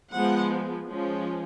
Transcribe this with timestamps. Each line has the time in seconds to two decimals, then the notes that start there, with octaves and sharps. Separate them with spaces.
0.13 F3 G#3 B3 F#5
0.88 F3 G#3 C#4